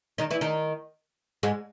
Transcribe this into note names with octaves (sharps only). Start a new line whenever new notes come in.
D#3 D#4
E3 E4
D#3 D#4
G#2 G#3